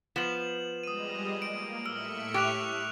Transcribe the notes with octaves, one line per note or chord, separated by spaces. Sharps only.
F3 B3 E7 F#7
G3 G#3 D#5 D#6 D#7
A#3 D7
A2 E5 E6 F6 C#7 D7
G4 C#6 F#6 F7